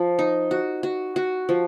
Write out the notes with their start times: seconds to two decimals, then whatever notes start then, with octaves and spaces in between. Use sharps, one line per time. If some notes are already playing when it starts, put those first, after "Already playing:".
Already playing: F3
0.19 D#4
0.51 F#4
0.83 F#4
1.16 F#4
1.49 F3